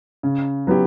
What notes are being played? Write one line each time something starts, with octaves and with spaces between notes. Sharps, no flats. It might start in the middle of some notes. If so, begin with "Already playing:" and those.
C#3
F#3 B3 E4 G4